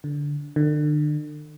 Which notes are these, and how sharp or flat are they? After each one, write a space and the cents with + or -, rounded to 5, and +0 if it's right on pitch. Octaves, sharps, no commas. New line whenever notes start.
D3 -15
D3 +35